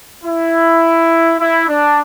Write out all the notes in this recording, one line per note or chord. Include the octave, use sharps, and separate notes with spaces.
E4
E4
D4